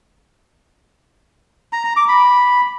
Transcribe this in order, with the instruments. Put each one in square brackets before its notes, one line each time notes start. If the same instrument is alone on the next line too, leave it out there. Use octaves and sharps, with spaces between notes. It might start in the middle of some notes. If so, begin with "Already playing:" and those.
[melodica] A#5
A#5
D6
B5